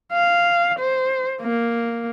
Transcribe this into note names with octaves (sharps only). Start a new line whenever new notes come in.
F5
C5
A#3